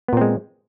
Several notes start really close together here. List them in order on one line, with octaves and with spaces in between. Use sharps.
B3 A#2 C4 G#3